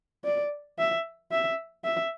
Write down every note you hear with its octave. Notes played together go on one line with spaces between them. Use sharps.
D5
E5
E5
E5